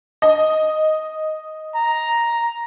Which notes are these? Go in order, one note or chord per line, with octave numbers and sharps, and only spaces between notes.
D#5
A#5